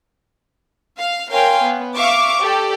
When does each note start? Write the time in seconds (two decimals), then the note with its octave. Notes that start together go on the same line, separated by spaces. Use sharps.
0.99 F5
1.31 A#4 C#5 F5 G5 G#5 C6
1.62 B3
1.96 E5 F5 C#6 D6
2.41 G4 A4 D5